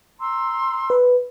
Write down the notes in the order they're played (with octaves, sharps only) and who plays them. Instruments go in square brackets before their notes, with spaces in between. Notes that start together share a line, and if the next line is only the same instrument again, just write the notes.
[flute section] A#5 C6 E6
[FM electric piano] B4